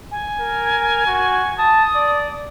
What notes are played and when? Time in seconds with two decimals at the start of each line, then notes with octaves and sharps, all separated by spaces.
0.11 G#5
0.40 A#4
1.07 F#4
1.58 A5 D#6
1.95 D5